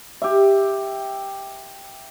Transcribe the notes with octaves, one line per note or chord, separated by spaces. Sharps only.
G4 E5